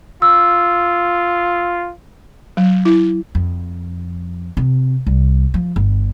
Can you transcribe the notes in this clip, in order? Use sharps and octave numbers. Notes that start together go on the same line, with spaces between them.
F4 E6
F#3
E4
F2
C3
C2
F3
G1